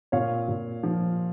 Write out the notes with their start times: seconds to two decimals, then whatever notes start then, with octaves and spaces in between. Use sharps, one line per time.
0.12 A#2 C#5 F5
0.48 A#2
0.83 F3